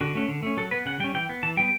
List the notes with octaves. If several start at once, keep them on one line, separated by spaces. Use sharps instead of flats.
D3 F#4
A3 C#4
D3
A3 C#4
F#3 A4
B3 B4
C#3 F#5
G3 C#4 G5
E3 G5
B3
E3 A5
G3 B3 G5